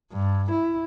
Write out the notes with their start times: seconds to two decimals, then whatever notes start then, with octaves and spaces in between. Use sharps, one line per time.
0.12 G2
0.51 E4